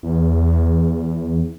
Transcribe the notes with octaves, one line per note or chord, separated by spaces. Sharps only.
E2